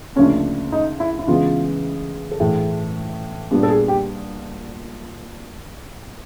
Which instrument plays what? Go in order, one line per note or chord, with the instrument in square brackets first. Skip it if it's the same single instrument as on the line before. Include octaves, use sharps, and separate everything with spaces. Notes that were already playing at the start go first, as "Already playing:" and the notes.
[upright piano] D2 C#3 F3 A#3 D4 [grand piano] C#4
[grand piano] D#4
E4
E4
[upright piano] C#3 E3 G#3 B3 [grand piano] F4
[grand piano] A4
[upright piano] A2 E3 A3 [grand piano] G#4
[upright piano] A#2 G3 B3 D4
[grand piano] A4
G#4
G4